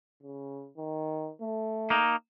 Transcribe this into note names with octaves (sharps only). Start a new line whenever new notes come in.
C#3
D#3
A3
A#3 D#4